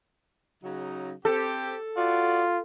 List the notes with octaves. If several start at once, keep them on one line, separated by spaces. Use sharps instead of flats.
C#3 F#3 D#4
C4 G4 A4
F4 F#4 D5